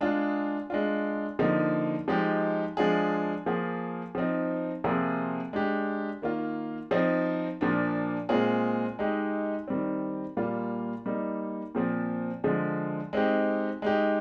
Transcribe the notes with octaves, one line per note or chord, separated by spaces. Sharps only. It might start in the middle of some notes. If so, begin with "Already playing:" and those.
G#3 D4 F4 G#4
G#3 D4 F4
D3 F3 A#3 D#4
F3 G#3 D#4 G4
F3 G#3 D4 F4 G#4
F3 A#3 F4 G#4
F3 C4 D#4
C3 F3 A#3 F4 G#4
G#3 D4 G4
D#3 A#3 F4
F3 C4 D#4
A#2 F3 A#3 D4
A#2 G#3 C4 F4 G#4
G#3 D#4 G4
D#3 G3 C4
A#2 G3 A#3 F4
G3 A#3 D#4
A#2 F3 C4
D3 F3 G#3
G#3 C4 D#4 G4
G#3 D#4 G4